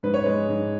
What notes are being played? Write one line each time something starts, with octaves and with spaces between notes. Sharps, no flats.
G#2 B4
C#5
G#3 B4
G#2